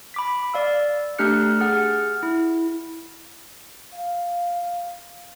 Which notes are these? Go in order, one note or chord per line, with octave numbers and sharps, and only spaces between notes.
B5 D6 B6
D5 F5 E6
A3 D4 G4 F6 F#6 C#7
G#4 F#5 F6
E4
F5